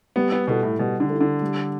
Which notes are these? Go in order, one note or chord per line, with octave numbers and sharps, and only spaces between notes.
G3 B3
B3
B2 E4 A4
A2
B2 G3
D3
E4 A4
D3
G3